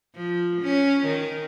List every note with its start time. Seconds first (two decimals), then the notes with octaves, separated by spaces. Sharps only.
0.16 F3
0.62 C#4
1.06 D#3